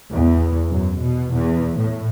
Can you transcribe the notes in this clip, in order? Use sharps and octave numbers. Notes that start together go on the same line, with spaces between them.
E2
F#2
B2
E2
A2